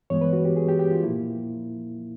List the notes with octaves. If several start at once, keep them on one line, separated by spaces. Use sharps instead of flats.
G2 E3 G#3 B3 C#5
B4
F#4
G4
G#4
G4
G4
F4
A#2 F3 A#3 E4